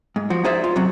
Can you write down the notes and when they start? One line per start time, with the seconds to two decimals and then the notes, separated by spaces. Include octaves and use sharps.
0.16 G#2
0.30 F3 F#4
0.44 D#4 G#4 C5 D5 E5
0.64 F4
0.76 F#2 C3 F#3